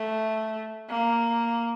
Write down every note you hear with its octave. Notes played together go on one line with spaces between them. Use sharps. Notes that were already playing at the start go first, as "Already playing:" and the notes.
Already playing: A3
A#3